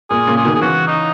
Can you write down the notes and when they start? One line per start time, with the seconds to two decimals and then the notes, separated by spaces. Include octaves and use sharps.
0.10 A#2 G#4
0.27 A#2 C#3
0.36 G#4
0.45 B2 D#3
0.55 G#4
0.61 C#3 E3 F#4
0.87 D#4